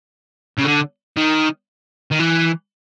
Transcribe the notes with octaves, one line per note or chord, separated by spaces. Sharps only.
C#3
D3
D#3
D#3
E3